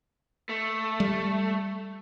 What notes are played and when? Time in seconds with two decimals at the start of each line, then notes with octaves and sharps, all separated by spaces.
0.49 A3
1.00 G3